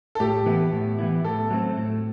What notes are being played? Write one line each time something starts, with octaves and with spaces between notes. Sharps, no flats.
A4
A2 G4
E3 B3 E4
A2
E3 B3 E4
A2 A4
F#3 A3 C4
A2